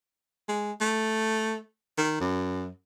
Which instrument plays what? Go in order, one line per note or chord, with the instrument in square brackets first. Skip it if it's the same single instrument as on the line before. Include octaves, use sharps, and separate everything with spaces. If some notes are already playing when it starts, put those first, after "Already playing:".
[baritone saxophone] G#3
A3
D#3
F#2